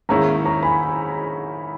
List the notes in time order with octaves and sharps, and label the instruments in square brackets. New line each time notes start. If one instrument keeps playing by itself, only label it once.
[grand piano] G#2 D#3 A#3 C#4 E4 [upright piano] A#5 C#6
[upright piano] A#5 C#6
G#5 B5